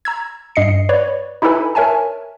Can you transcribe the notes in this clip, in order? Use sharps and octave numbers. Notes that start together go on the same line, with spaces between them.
A#5 E6 G#6
G2 D#5 C7 C#7
B4 C#5 D5
D#4 E4 G4 A4 B4 G#5
A#4 C#5 E5 G#5 A5